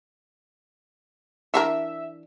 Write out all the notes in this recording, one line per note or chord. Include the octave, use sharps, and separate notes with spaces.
E3 D4 A#4 E5